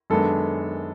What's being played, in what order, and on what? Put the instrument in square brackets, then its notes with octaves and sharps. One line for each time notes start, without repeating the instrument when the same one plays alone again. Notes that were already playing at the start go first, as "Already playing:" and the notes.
[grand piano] F#2 D#3 G#3 B3 D4 [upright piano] A4